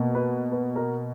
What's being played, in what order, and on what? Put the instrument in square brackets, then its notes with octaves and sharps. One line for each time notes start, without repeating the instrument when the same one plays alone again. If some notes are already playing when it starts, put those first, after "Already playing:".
Already playing: [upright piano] B2 A#3
B4
B4
A#4